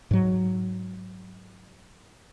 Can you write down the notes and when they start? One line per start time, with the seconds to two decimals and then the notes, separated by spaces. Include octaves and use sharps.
0.11 G#2 F#3